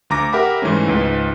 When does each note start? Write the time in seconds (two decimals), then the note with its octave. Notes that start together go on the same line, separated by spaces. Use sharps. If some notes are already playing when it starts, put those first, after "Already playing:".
0.10 D2 A#5 D6 A#6
0.33 G4 A#4 E5 F#5 B5 D6
0.62 G#2 E3 A3 C#4
0.88 C#2 G#2 B4